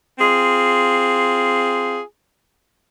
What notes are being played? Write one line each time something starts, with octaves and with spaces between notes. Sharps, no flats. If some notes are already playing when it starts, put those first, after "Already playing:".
C4 F4 G#4